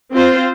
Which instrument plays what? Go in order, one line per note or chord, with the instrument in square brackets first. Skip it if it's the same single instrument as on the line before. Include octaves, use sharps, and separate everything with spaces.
[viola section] C4 F4 C5